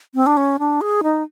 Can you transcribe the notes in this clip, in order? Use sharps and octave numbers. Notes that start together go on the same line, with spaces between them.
C4
D4
C#4
D4
G#4
D#4